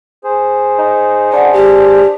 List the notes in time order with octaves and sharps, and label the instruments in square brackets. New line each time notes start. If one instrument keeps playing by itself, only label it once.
[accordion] G#4 C5
[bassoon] D#4
[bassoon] D4 [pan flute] F#5
[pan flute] G4